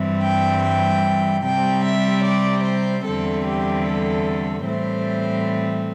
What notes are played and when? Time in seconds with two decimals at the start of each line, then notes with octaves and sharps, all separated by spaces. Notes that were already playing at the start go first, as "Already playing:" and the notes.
Already playing: G2 E3 G3 C4
0.22 G5
0.63 G5
1.44 C3 G3 C4 G5
1.84 E5
2.24 D5
2.64 C5
3.04 E2 D3 G3 C4 A4
3.44 G4
3.85 A4
4.65 A2 E3 G3 C4 C5